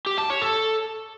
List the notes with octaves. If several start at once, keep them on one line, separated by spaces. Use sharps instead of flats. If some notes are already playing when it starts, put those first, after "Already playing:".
G4
A5
C#5
A4